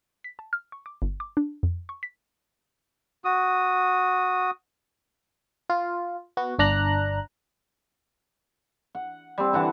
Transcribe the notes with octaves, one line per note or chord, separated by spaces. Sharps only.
B6
A5
F6
C#6
D6
G1
D6
D4
F2
C#6
B6
F#4 D#6
F4
B3 F#4
G1 D4 A#5 F#6
F#5
G3 C4
D3 E3 F#5 A5